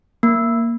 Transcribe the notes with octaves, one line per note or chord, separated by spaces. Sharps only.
A#3